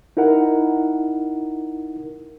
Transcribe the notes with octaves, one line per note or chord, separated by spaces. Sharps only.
D#4 E4 A#4 F#5